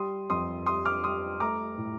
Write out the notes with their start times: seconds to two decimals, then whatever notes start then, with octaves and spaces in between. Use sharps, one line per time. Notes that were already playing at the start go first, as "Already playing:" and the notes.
Already playing: G3 C6 D#6
0.30 F2 C6 D#6
0.66 G3 C6 D#6
0.85 D6 F6
1.04 G3 C6 D#6
1.40 A3 A#5 D6
1.78 A2